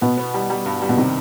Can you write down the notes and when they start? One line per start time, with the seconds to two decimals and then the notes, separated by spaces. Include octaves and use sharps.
0.01 B2 B3
0.17 B3
0.34 G3
0.50 G3
0.66 G2
0.82 G3
0.89 B2
0.97 C3 D#3